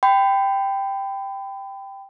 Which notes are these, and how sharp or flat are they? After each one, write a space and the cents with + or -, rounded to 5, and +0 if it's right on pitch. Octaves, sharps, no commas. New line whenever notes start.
G5 +0 B5 +35